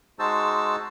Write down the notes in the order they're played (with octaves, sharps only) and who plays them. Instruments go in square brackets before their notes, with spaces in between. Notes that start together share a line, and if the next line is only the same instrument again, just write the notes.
[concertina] G#3 D#4 F#4 C5 A5 E6